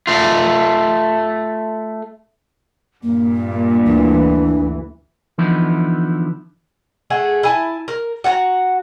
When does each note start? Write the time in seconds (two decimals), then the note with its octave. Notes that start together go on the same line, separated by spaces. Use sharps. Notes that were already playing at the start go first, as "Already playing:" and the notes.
0.07 A3 F4
3.03 G2 A#2 A#3
3.86 D2 E3 D4
5.38 D3 E3 F3 B3 D#4 E4
7.10 A3 G#4 F#5
7.43 E4 G#5 A5
7.88 A#4
8.24 F#4 F#5 A5 A#5